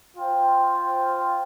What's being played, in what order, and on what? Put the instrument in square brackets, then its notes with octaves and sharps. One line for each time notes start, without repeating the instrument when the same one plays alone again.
[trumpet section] F4 C5 G5